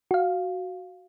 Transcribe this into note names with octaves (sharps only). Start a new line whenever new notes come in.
F#4 F5